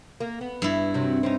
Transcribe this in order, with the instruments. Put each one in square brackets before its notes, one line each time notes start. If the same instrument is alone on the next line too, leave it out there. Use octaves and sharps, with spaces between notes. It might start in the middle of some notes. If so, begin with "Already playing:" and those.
[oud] A#3
B3
[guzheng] G2 E4
[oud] C3 F#3
C4 C#4 D#4